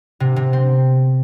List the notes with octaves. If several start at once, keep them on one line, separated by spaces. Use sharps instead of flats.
C3
C3
C4